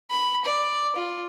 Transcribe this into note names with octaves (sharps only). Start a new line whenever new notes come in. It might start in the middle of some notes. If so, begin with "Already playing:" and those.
B5
D5
F4